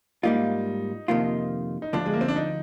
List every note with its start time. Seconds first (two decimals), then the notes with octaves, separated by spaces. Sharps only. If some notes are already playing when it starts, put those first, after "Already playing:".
0.23 G#2 G3 A#3 D#4 F4
1.08 F2 C3 D#3 A#3 F4
1.82 D#4
1.93 D2 D3 F3 D4
2.06 G#3
2.13 A#3
2.21 C4
2.28 D4
2.36 D#4